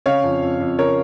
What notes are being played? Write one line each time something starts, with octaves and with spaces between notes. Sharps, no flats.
C#3 C#5 F5
F2
F2
F2
C#3 A#4 C#5